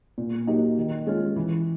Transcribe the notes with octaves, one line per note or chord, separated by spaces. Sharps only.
A#2
F#3 A#3 D#4 G4
D#3
G#3 C#4 F4
E3